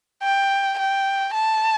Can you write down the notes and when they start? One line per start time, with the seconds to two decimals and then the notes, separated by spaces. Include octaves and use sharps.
0.23 G5
0.78 G5
1.34 A5